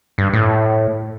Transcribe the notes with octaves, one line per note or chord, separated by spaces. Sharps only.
G2
A2